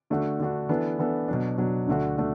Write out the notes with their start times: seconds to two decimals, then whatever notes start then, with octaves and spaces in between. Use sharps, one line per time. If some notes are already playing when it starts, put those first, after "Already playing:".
0.10 D3 A3 D4 F#4
0.39 D3 A3 D4 F#4
0.69 E3 B3 D4 A4
0.99 E3 B3 D4 A4
1.28 B2 F#3 D4
1.58 B2 F#3 D4
1.87 D2 D3 A3 D4 F#4
2.17 A3 D4 F#4